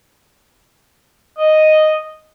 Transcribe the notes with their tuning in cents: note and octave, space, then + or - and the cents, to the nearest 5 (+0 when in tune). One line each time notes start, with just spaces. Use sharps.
D#5 -5